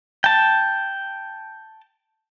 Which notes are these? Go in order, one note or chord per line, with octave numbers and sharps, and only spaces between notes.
G5 A5